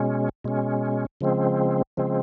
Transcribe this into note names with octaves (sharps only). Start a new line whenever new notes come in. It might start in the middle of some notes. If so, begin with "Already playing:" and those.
Already playing: B2 G#3 C#4
B2 G#3 C#4
C#3 F3 G#3 C4
C#3 F3 G#3 C4